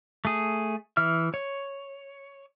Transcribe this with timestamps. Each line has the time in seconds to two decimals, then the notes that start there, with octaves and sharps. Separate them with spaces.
0.25 A3 G#4
0.97 E3 E5 F6
1.34 C#5